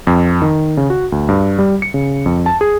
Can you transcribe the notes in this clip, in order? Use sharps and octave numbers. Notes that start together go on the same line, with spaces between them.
F2
D#3
C#3
F#4
D2
G2
G3
C#7
C#3
F2
A5
G#4